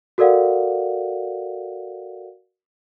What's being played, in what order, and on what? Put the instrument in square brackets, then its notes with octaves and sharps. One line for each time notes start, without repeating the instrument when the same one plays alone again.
[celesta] F#4 A4 A#4 D5 F5 F#5